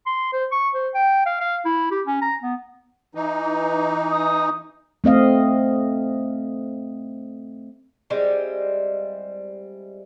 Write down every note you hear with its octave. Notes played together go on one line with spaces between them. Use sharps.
C6
C5
C#6
C5
G5
F5
F5
E4
G4
C#4
A#5
B3
E3 D#4
D#6
A3 C4 D#5 F5
G3 G#3 C4 E4